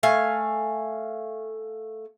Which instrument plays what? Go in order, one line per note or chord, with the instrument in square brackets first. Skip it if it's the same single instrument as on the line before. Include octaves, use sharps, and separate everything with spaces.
[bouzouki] A3 F5 G#5